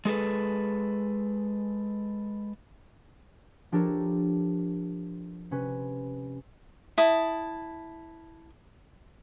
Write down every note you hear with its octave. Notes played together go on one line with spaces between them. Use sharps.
G#3 G#4 A4 B4
F3 D4 G4 A4 A#4 C#5
C3 C#4 B4
E4 A5 D#6